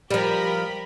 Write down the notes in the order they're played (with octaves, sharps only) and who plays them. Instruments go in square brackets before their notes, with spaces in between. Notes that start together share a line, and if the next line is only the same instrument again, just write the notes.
[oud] F3 G3 [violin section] G4 A#4 B5